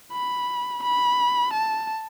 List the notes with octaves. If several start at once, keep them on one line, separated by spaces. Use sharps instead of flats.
B5
B5
A5